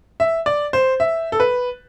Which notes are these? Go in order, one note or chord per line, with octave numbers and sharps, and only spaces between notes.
E5
D5
C5
E5
A4
B4